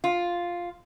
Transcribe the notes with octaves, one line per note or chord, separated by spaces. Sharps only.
F4